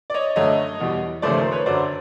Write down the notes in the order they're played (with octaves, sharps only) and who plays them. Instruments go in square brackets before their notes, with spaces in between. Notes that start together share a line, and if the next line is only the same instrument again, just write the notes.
[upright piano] D5
C#5 D#5
F#2 D3 F#3 A3 C#5 D#5
E2 B2 G3
D#2 C#3 F3 A3 C5 D5
A#4 C5
B4 C#5
F#2 D3 F#3 C5 D5